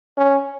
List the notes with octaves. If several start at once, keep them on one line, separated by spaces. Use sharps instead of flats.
C#4